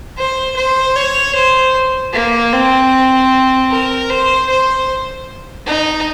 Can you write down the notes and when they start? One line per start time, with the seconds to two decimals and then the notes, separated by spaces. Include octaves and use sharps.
0.18 C5
0.57 C5
0.96 C#5
1.35 C5
2.13 A#3
2.53 C4
3.71 A#4
4.09 C5
4.49 C5
5.66 D#4